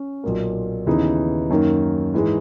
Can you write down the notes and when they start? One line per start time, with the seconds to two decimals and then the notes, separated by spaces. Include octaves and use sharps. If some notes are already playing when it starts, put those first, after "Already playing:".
Already playing: C#4
0.24 B1 A#2 A#3
0.86 D#2 C#3 E3 B3 D#4
1.50 F#2 D#3 A#3
2.14 G#2 E3 G#3